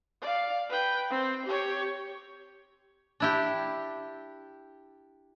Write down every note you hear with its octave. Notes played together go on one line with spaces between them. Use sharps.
D5 F5
B4 G5
C4
G4 C#5
D4 E4 G4